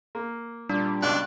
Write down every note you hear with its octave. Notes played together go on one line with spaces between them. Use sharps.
A#3
A#2 G3 D4
C#2 G2 B2 D4 F#6